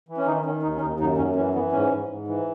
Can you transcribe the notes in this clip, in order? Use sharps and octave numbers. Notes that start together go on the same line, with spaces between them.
E3
C#4
D#3 D#4
D#3 C#4
D#2 D#4
C#4
D#2 D#4
F#2 D#4
F#2 C#4
E3 C#4
E3 B3
G#2 C#4
G#2
G#2
E3